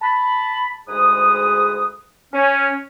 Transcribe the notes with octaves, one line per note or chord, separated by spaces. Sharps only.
A5 B5
D2 G#2 G#3 G#4 B4 D#6
C#4